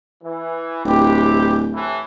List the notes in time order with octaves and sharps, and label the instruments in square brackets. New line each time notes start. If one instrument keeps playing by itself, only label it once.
[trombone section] E3
[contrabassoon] D1 [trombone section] E3 C4 G4
[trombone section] A2 C3 E3